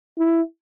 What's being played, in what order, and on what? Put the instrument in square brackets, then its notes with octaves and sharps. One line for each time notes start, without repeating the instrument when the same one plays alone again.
[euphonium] E4